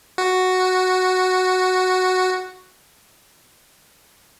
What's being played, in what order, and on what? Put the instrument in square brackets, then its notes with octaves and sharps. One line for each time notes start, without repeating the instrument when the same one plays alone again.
[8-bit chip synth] F#4